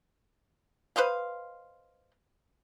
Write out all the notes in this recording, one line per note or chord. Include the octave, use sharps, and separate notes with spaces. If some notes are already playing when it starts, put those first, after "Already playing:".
B4 C5 D#5 F5